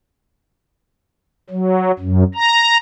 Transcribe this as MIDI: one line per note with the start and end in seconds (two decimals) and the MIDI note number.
1.50 1.92 54
1.99 2.23 42
2.35 2.77 82